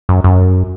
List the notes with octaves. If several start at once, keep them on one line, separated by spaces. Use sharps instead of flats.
F#2
F#2